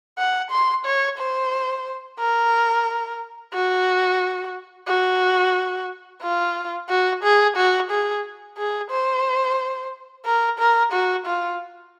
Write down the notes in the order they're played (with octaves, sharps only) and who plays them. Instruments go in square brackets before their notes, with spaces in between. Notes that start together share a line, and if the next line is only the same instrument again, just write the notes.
[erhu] F#5
C6
C#5
C5
A#4
F#4
F#4
F4
F#4
G#4
F#4
G#4
G#4
C5
A#4
A#4
F#4
F4